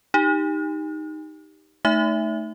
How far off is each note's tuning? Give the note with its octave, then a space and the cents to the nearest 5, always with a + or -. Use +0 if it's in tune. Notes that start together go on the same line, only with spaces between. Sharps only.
D#4 +0 G4 +0
A3 +0 D#4 +0 E5 +0